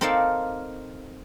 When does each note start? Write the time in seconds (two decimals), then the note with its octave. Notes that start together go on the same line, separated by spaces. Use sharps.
0.01 C4 D#4 A4 A#4 D5 F5